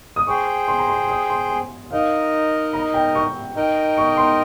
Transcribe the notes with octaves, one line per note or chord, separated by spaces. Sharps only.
D#6
G#4 C5 G5 C#6
C6
A#5
C6
D#6
C6
G#5
D#4 A#4 D#5 F5
A#5
G5
C#6
D#4 A#4 D#5 G5
C#6
C6